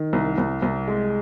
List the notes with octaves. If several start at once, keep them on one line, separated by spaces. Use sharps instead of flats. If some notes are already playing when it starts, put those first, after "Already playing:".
Already playing: D#3
C2
C2
C2
G#3